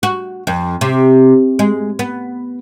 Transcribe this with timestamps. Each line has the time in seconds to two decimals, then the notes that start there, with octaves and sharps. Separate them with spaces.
0.03 F#4
0.47 F2
0.81 C3
1.59 G#3
1.99 B3